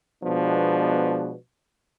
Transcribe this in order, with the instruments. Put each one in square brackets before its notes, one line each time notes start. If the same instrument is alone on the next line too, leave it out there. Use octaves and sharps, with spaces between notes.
[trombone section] B2 F3 G#3 B3 D4